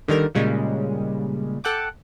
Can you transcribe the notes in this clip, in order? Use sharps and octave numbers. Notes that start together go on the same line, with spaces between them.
D3 D#3 G3 A#4
A#2 C#3 G3 G#3 C#4
A4 F#5 G5 D6